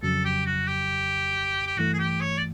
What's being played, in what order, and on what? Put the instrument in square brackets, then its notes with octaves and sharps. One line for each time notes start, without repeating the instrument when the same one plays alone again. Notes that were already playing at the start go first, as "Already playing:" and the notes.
[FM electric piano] F2 C#3 F#3 [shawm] A4
[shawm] G4
F#4
G4
G4
[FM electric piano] G2 E3 A3 [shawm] F#4
[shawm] G#4
G4
C#5
D5